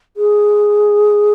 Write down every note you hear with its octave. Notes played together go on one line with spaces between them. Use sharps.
G#4